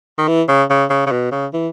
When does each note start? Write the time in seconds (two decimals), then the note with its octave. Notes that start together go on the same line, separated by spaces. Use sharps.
0.18 D#3
0.28 E3
0.49 C#3
0.70 C#3
0.90 C#3
1.07 C#3
1.12 B2
1.32 C#3
1.54 E3